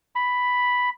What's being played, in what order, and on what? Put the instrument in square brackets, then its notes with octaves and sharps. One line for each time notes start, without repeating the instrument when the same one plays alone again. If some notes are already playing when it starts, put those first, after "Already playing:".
[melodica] B5